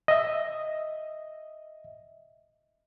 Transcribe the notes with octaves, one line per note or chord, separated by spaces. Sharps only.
D#5 E5